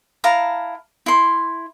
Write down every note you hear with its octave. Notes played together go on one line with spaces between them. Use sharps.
E4 F5 A5 A#5
E4 C6